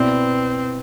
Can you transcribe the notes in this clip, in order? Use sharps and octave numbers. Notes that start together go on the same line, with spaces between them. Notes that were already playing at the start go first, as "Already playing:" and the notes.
Already playing: B2 B3 C4 E4 B4 D5